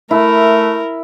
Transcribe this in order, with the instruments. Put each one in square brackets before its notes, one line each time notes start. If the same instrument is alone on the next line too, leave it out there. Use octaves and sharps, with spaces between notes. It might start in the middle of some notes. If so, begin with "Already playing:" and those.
[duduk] A3 [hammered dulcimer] E4 [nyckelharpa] A#4